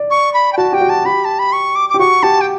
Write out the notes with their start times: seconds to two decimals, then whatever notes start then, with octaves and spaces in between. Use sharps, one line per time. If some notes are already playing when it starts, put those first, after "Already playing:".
Already playing: D5
0.11 C#6
0.34 B5
0.53 G5
0.57 F#4 A5
0.72 G4 G5
0.81 F#4
0.89 A5
1.05 G4 B5
1.25 A5
1.39 B5
1.53 C#6
1.75 D6
1.89 G4 D6
1.99 F#4 C#6
2.23 G4 A5
2.41 G5